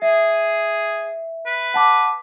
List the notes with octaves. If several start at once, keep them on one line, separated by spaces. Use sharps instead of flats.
G#4 E5
B4
F#5 A5 D6